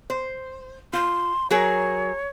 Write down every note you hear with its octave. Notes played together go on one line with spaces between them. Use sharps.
C5
F4 C6
F#3 G#4 A#4 C#5